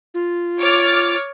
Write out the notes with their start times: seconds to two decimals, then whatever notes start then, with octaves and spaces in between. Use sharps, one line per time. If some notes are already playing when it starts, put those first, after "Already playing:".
0.14 F4
0.60 C#5 D6 F6 A6